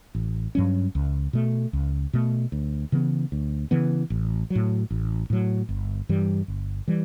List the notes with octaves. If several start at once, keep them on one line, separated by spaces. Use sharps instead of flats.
A1
G2 F#3 C#4
C#2
B2 A3
C#2
B2 A3
D2
C#3 E3 B3
D2
C#3 E3 B3
A1
F#3
A2
A1
A2 F#3
G1
G2 E3 G3
G1
E3 G3